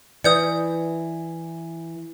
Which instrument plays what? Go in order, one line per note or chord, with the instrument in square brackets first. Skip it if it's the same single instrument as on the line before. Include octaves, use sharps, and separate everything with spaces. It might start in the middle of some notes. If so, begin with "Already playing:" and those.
[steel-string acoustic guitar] E3 [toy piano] B4 D5 [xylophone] D#6 G6 C#7